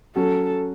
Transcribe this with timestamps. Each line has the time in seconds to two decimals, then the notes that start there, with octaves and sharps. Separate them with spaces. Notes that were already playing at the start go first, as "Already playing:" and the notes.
0.16 F#3 C#4 F#4 A4